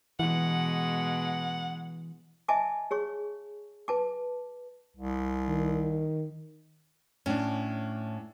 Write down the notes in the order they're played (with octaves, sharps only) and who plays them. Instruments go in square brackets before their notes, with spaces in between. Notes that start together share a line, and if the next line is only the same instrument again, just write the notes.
[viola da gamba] B2 G#3 [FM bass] E3 [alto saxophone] F#5
[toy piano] D#5 E5 G#5 A5 D6
G#4 C#5 C#6
B4 A5 D6
[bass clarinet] C2
[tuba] D#3
[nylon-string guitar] A2 [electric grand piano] C#4 D4